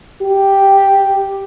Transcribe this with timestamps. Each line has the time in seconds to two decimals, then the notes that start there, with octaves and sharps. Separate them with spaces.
0.22 G4